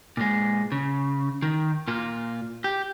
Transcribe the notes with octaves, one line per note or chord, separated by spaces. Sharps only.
A#2 G#3
C#3
D#3
A#2 F4
G4